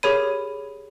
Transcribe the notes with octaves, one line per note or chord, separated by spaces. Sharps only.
G4 G#4 A#4 C#5 B5 D#7